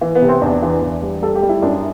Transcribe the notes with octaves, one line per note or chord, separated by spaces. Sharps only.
E3
B3
C3
C4
E2 D4
E3
E2
G3
G3 A4
G4
G3
E4
F#2 D4